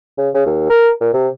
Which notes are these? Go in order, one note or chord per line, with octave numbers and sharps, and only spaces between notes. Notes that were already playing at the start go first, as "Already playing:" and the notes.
C#3
C#3
D#2
A#4
A#2
C3